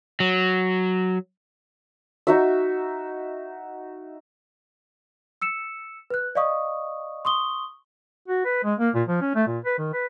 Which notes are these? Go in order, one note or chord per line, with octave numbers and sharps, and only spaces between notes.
F#3
D#4 F#4 E5
E6 C#7 E7
B4 F#6
D5 D#5 F5 C#6 D#6
C6 C#6 D#6 G7
F#4
B4
G#3
A#3
A#2
F3
C#4
A3
A#2
B4
D#3
B4